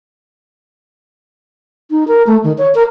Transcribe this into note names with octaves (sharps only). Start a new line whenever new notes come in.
D#4
A#4
A3
D#3
C#5
A#4